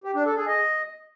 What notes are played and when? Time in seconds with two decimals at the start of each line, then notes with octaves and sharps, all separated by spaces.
0.04 G4
0.15 D4
0.25 A4
0.36 G#4
0.47 D#5